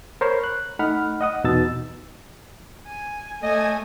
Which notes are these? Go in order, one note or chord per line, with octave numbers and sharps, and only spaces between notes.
A#4 C5 C#5 B5 C6
F#6
A3 D#4 F#5 B5 F6
D#5 F#5 D#6
E2 B2 D#4 E6 A6
G#5
A3 D#5 G#5